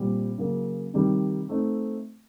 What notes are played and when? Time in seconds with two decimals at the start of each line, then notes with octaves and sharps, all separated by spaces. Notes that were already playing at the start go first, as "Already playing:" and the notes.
Already playing: A#2 G3 C4
0.38 C#3 F#3 A#3
0.94 C3 D#3 G3
1.49 A3 C4 D#4